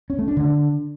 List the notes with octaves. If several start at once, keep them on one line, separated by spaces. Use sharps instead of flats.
C#4
A3
D4
D3